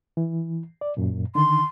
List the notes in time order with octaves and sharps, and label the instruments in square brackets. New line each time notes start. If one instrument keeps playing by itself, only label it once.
[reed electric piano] E3
D5
F#2 A#2
[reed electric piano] D3 D#3 [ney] C6